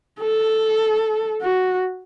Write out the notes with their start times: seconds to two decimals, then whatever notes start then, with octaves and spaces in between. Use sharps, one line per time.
0.20 A4
1.42 F#4